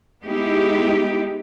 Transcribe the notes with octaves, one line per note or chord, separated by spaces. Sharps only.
G#3 B3 D#4 E4 G4